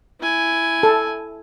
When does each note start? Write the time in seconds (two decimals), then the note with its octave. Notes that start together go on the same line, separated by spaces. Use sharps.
0.20 E4 G#5
0.83 A4